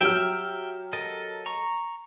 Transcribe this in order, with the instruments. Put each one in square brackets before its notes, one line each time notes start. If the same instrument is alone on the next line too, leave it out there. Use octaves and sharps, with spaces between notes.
[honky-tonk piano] F#3 G4 F6 [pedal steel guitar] E5 G5
[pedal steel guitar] A4 A#4 D#5
A#5 C#6